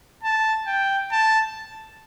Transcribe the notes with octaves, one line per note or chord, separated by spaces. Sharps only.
A5
G5
A5